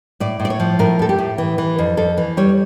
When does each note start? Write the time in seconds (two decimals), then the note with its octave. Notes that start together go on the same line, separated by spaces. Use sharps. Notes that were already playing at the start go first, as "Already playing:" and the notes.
0.20 A2 D5
0.40 A2
0.45 D5
0.50 C#5
0.60 F3
0.79 A2 A#4
0.99 A2 A4
1.09 G4
1.19 A2
1.38 E3
1.58 E3
1.78 F2
1.97 F2 A4
2.17 E3
2.37 G3 C#5